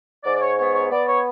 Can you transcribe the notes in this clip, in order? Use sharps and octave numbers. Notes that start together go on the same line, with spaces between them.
G#2 D5
D5
C#5
B3 C#5
C#5
B3 D5
C#5